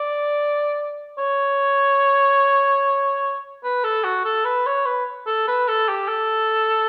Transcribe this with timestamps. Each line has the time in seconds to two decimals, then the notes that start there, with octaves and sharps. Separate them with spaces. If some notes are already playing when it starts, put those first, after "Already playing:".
Already playing: D5
1.18 C#5
3.64 B4
3.84 A4
4.04 F#4
4.25 A4
4.45 B4
4.66 C#5
4.86 B4
5.26 A4
5.47 B4
5.68 A4
5.88 G4
6.08 A4